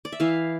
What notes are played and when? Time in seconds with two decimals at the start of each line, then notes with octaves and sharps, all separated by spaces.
0.05 D5
0.12 E5
0.20 E3 F5